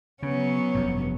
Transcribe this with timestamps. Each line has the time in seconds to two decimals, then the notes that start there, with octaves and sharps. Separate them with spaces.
0.23 C#3 F#3 B3 C#4
0.75 F1 G2